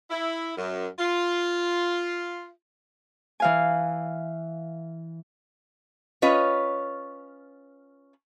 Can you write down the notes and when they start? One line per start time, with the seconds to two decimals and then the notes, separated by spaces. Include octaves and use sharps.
0.10 E4
0.56 F#2
0.99 F4
3.40 E3 F5 G#5
6.22 C#4 F4 B4 C#5 D#5